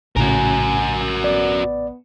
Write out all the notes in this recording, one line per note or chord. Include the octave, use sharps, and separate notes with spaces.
A#1 A2 C#3 F#4 A#4 G#5
B3 D5